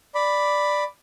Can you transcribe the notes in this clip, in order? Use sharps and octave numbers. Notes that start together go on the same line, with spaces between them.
D5 B5